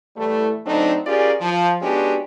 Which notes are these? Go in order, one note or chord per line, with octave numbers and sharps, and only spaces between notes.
A2 E3 G3 A3
D3 F#3 A3 C4 D4 D#4
C#4 F4 G4 G#4 A#4 D5
F3
G#3 B3 C#4 D4 F#4 G4